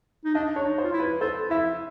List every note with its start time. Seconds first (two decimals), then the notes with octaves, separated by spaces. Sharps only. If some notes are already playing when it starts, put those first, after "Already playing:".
0.25 D#4
0.34 D4 D#5
0.55 D4 C#5
0.63 D#4
0.78 C5
0.84 F4
0.93 E4
1.00 B4
1.21 A4 C5
1.50 E4 E5